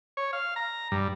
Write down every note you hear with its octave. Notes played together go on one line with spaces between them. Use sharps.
C#5
F5
A#5
G2